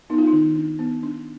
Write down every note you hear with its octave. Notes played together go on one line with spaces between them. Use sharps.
B3 D#4
F4
D#4
D#3
D4
B3
D4